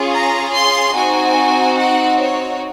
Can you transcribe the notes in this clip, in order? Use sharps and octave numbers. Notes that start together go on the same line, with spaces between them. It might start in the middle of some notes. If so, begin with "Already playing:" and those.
Already playing: C#4 F4 G#4
A#5
C6
C4 D#4 F#4 G#5
F#5
C#5